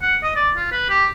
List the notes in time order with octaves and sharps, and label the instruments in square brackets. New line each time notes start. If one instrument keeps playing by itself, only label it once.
[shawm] F#5
D#5
D5
F4
B4
G4